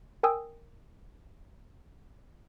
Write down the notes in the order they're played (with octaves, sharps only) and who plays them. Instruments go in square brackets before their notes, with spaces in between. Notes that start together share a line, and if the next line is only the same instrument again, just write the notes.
[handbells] A#4 G5 G#5 D#6 E6